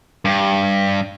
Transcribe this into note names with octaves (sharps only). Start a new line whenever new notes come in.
G2